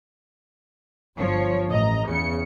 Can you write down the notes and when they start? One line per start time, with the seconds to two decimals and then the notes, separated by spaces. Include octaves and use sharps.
1.17 G1 F3 C#5
1.68 A1 D#5 A#5
2.07 E2 C#3 C#7